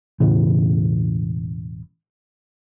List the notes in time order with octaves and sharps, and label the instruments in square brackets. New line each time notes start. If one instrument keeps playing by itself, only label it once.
[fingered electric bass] E1 A2 C#3 E3